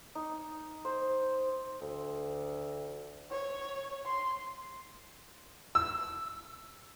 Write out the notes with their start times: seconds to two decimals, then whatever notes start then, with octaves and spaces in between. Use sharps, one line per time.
0.15 D#4
0.85 C5
1.81 D2
3.31 C#5
4.06 C6
5.75 E6